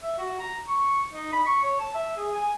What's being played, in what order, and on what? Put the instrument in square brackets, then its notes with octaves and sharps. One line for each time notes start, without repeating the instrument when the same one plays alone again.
[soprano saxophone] E5
F#4
A#5
C#6
D#4
B5
C#6
C#5
A5
E5
G#4
G#5